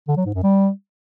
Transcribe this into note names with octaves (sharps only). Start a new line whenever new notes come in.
D3
F#3
G#2
F#2
G3